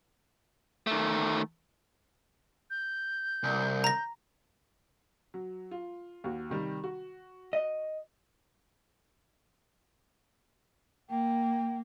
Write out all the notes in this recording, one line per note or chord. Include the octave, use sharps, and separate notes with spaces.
D#3 A3
G6
C2
A#5 A#6
F#3
F4
D#2 F#4
C3 D#3 G3
F#4
D#5
A#3 G5